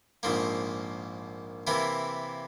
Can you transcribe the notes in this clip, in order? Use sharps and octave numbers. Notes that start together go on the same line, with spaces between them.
A#1 G#2 F3 A#3
C3 E3 A#3 E4